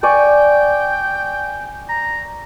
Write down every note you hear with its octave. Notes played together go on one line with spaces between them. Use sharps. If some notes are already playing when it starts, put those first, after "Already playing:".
D5 G5 G#5 C#6
A#5